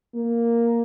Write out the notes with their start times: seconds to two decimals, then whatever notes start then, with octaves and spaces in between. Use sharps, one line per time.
0.14 A#3